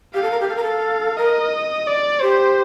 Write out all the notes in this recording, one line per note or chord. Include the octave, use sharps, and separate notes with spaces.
G4 F5
A4
A#4
G4
A4 F5
A#4
A4
A#4 D#5
D5
G4 C5